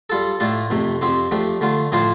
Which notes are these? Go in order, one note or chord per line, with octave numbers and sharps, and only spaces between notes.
G3 F4 A4
A2 A3 D4 F4
F2 C3 A3
F2 F3 C4 G4 C5
F3 A3 D4 G4
D3 A3 F4
A2 F3 D4 F4 C5